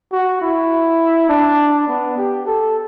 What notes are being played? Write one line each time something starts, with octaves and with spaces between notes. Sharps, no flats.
F#4
E4
D4
B3
G4
A4